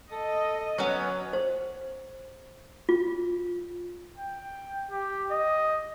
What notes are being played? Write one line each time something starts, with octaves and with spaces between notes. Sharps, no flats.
A4 D#5
F#3 B3 C#4 C#5 F#6
C5
F4
G5
G4
D#5